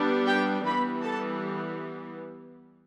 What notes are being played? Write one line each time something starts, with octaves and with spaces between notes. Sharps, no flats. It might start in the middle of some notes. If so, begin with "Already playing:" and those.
Already playing: G3 B3 D4
G4 G5
E3 G3 B3 B4 B5
A4 A5